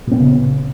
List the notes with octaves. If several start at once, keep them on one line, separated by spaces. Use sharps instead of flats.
A#2 C#3 B3 C4